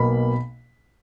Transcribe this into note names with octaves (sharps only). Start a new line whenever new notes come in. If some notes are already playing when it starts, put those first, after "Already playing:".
Already playing: B1 B2 A#3 B5